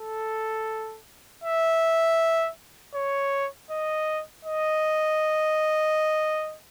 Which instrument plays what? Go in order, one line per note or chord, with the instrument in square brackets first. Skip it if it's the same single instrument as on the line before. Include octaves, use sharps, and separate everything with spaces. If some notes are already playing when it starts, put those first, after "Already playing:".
Already playing: [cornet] A4
E5
C#5
D#5
D#5